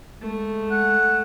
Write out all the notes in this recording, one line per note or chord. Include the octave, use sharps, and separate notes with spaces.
G#3 A3
F#5